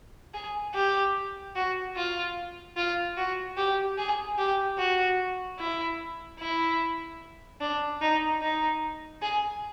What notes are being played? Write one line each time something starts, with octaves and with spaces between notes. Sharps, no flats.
G#4
G4
F#4
F4
F4
F#4
G4
G#4
G4
F#4
E4
E4
D4
D#4
D#4
G#4